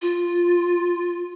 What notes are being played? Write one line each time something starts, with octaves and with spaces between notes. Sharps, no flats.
F4